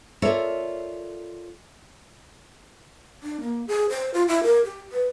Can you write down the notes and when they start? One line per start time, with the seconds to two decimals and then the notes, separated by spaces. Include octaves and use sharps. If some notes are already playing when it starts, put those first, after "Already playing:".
0.22 F4 A4 A#4 C#5 D5 E5
3.23 D4
3.41 A#3
3.67 G#4
3.90 C5
4.14 F4
4.28 E4
4.43 A#4
4.65 G4
4.92 B4